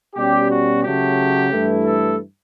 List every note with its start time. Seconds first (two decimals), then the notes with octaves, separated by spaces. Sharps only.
0.16 B2 G3 C#4 G4
0.50 F#4
0.83 C#3 F#3 A3 G4
1.51 G2 E3 A3 E4
1.85 A4